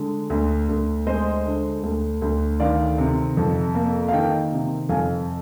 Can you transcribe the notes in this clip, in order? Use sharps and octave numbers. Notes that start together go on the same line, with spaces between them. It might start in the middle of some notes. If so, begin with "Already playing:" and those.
Already playing: D3 G#3
D2
D2
G#3 C5 D#5
D3
D2
D2
D#3 D5 F5
C3
F2
A#3
F5
D#3 D#5 G5
C3
F2 F5 G#5